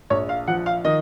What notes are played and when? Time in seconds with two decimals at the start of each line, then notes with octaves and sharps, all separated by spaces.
0.10 A#1 C#5
0.29 F5
0.48 F3 F#5
0.66 F5
0.85 D#3 D#5